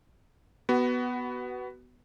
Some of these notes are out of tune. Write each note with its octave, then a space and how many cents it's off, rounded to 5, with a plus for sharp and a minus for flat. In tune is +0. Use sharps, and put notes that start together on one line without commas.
B3 +0 F#4 +25